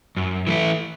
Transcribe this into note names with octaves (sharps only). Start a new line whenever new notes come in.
F#2
E3 A3 E4